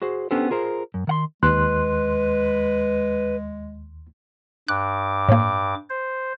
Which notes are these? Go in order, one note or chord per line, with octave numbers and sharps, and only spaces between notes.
F#4 G#4 C5
B3 C#4 D4 G4 A4 C5
F4 G#4 A#4 C5
F#2
D#3 F#5 C6
D#2 G#3 B4 C6 F#6
G2 D6 F#6
A2 A#3
C5